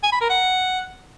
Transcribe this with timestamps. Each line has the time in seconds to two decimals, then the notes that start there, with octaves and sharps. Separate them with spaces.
0.03 G#5
0.12 B5
0.21 A#4
0.30 F#5